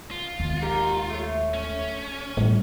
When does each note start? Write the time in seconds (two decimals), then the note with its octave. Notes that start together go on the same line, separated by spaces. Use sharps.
0.11 F4
0.40 D#2 G#3
0.61 D#4 G4 A#4
1.10 A3 C#5
1.54 C#4
2.37 A2 G3 F4